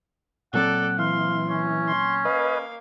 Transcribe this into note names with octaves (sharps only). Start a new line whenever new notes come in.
A#2 F#3 C4 A4 D5 F#5
E3 F5 C6
C#4
C6
A#3 B4 D#5 F5